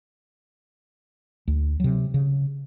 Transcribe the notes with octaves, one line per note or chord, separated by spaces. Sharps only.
D2
C3 F#3
C#3